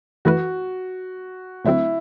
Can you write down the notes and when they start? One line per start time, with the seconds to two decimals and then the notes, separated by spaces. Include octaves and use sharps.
0.25 F#2 E3 A3 E4 F#4 B4
1.65 D2 D3 F#3 A3 C4 E4